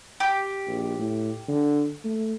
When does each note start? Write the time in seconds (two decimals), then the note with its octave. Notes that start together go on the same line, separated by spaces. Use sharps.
0.20 G4
0.68 A#1
0.99 A2
1.48 D3
2.04 A3